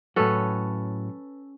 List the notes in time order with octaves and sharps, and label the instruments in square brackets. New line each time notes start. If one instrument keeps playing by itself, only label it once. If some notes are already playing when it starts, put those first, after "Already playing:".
[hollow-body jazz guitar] A2 F#3 [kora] C#4 A4 B4